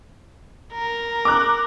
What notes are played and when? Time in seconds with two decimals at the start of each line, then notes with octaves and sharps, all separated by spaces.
0.73 A#4
1.25 D6 F#6